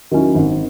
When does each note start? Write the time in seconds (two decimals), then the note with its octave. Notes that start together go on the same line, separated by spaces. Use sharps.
0.11 D#3 F#3 C#4 E4
0.35 G#1